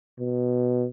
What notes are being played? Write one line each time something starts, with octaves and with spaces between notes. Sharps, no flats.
B2